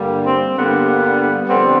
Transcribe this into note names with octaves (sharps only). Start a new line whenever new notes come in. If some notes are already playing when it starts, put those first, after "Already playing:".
Already playing: G2 D3 G3 A#3
C4
G2 D3 G3 A#3 B3
F2 D3 G3 B3 C4